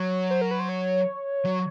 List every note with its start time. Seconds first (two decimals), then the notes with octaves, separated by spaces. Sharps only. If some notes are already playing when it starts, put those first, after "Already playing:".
Already playing: F#3 C#5
0.31 C5
0.41 A#4
0.51 B4
0.60 C5
0.69 C#5
1.45 F#3